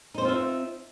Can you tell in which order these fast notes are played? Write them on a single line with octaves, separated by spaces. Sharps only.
D#4 C5 C4 F4 E5